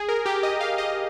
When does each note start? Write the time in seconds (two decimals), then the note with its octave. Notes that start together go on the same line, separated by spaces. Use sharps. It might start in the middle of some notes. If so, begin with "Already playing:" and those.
Already playing: G#4
0.09 A#4
0.26 G4
0.43 D#5
0.61 F5
0.78 D#5